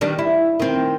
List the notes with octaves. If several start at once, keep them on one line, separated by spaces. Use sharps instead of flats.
D#3 G3 D4
E4
D#3 C4